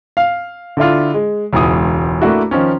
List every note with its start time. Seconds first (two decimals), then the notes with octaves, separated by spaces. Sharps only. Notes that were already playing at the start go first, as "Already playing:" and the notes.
0.17 F5
0.77 D3 D4 E4 F4
1.14 G#3
1.53 E1 C#2 E3 D#6
2.22 A3 A#3 D4 E4 F#4
2.51 D#3 F3 C#4